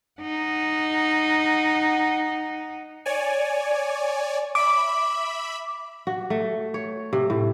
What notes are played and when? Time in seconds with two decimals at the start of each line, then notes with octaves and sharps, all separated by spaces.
0.21 D#4 F#5
3.06 C#5 D5 G#5
4.55 E5 B5 D6
6.07 F#4
6.30 A3
6.74 C#5
7.13 C3
7.30 A2